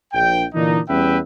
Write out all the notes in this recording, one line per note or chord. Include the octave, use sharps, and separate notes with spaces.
A#1 G5
A#2 D3 E3 D4 D#4
E2 G3 C#4 B4 E5 G5